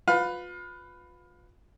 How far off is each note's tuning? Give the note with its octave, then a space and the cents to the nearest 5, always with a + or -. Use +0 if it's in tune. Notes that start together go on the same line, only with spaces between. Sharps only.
F4 +30 B4 +10 F5 +25